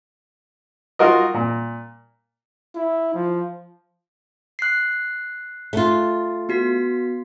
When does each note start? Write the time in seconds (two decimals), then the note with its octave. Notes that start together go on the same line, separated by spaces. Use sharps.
0.99 D#4 F4 F#4 A#4 D#5
1.34 A#2
2.75 E4
3.14 F3
4.59 F#6 C7
5.73 A3 F4
6.49 B3 F#4 B6